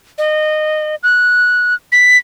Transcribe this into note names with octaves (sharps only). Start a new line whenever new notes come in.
D#5
F#6
B6